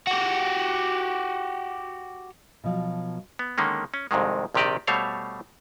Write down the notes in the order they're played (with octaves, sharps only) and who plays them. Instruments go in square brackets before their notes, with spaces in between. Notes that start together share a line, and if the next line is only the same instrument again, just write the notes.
[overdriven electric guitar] F#4 G4
[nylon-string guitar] B2 F3 F#3
[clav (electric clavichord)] B3
D3 D#3 G#3 A#3 C#4
C#4
C2 F2 G#2 C3 D#3 G#3
A#1 C3 D#3 G4 D5 D#5
B2 G3 A3 C5 C#5 F5